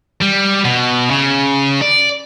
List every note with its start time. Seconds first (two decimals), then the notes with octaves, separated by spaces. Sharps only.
0.21 G3
0.64 B2
1.11 C#3
1.82 D5